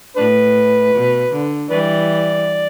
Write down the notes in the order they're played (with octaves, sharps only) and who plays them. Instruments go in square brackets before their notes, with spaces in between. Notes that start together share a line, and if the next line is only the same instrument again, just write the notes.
[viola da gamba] A2 [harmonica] D4 B4
[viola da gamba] B2
D3
[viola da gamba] E3 G3 [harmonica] B4 D5